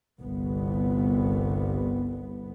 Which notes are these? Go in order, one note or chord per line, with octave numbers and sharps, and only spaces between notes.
G1 C2 B3